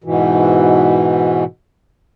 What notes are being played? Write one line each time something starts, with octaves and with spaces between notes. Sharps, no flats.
G#2 B2 E3